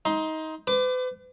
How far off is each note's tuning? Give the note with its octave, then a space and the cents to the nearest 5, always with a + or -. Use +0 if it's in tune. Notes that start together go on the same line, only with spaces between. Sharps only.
D#4 +20 C6 +0
B4 +40 D6 +5